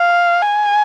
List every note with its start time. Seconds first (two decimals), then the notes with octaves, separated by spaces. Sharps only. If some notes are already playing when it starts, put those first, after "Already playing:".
Already playing: F5
0.42 G#5